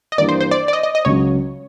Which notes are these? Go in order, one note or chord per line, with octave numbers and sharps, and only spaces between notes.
D#5
G2 E3 G3 A#3 D5
C5
C5
D5
D5
D#5
D#5
D#5
C#2 C#3 F#3 C#5